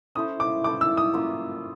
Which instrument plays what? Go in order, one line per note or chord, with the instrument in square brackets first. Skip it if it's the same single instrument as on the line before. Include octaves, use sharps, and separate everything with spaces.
[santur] C#4 E4 A4 C5 [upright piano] D#6
[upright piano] D6
[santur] C#4 E4 A4 C5 [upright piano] D6
[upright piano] E6
D#6
[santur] A#3 C#4 F4